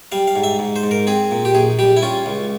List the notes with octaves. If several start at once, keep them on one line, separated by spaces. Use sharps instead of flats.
G3 F5
F5
G#2
E5
G#2
C5
G#2
A#4
C4 G#4
A#2
G4
A#1 G#4
G3 G4
E4
C#4 F4
C#2